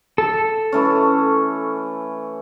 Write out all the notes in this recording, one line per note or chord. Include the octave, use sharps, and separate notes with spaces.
A4
E3 A3 C#4